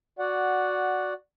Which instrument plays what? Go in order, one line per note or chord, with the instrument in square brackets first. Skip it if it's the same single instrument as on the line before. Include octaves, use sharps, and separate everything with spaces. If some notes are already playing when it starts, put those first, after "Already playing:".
[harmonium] F#4 D5 F#5